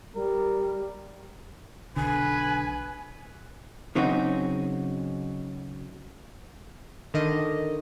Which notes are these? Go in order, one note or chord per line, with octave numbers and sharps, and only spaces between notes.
G3 A#4
B1 D3 B4 G#5
C#3 F#3 C4 C#4 D#4 F#4
D3 D#3 D#5